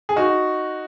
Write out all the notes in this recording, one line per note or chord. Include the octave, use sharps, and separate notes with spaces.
G#4
D#4 F#4